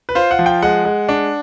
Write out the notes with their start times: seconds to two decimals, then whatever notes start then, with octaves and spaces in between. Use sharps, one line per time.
0.09 B4
0.15 F4 C5
0.31 F#5
0.39 F3
0.46 G5
0.62 G#3 F#5
0.85 G#3
1.09 D4